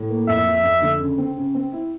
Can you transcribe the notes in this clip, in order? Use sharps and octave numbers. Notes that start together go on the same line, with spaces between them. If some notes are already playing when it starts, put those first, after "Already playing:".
Already playing: A2
A#3
F2 E5
F3
F2
D3
C#3
C4
C#3
C4
E4